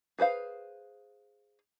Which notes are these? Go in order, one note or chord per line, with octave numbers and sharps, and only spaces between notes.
G#4 B4 C5 F5